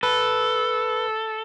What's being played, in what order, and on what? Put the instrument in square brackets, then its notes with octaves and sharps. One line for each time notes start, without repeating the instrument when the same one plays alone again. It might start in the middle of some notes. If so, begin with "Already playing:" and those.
[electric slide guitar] A4 [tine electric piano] B4